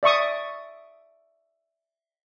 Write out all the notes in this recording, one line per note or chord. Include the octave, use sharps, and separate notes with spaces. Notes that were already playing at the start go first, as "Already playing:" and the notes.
D5 E5 C#6 D#6